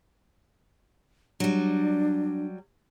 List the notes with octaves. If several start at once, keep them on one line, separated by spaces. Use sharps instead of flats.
F#3 G3 D4